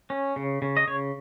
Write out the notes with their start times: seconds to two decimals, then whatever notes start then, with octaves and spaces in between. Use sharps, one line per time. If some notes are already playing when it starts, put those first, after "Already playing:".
0.10 C#4
0.36 C#3
0.62 C#3
0.77 D#5
0.88 C#3 C#5